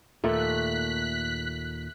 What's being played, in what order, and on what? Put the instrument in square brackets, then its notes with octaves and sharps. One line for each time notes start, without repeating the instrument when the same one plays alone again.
[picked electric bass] D#2 A#2 [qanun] A3 [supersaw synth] F#6 B6